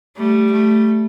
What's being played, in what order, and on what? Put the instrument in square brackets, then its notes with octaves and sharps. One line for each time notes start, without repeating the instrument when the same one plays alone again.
[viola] G3 [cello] A3
[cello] A3